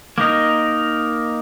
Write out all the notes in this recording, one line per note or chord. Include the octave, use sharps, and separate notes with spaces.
A#3 D#4 A#4 D#5